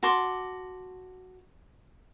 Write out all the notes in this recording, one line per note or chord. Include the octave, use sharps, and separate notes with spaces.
F#4 A5 C6 D6